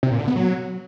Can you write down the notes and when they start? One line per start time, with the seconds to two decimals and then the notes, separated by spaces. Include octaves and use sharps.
0.03 C3
0.11 A#2
0.19 D3
0.28 B3
0.36 F#3